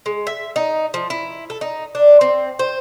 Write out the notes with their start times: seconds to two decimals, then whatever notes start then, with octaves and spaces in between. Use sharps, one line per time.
0.06 G#3
0.27 E5
0.56 D#4
0.94 F3
1.10 E4
1.50 A4
1.61 D#4
1.95 D4
2.21 C4
2.59 C5